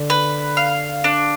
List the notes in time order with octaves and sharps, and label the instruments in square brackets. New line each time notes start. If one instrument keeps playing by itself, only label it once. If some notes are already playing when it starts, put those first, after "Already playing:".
Already playing: [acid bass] D3
[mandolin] B4
F5
D4